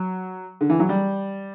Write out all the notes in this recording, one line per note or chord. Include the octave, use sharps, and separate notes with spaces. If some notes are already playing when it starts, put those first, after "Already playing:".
Already playing: F#3
D3
E3
F#3
G3